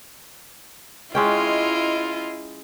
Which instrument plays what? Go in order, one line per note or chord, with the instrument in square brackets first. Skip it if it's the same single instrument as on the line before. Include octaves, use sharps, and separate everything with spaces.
[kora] G#3 C#4 G5 [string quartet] E4 F4 D#5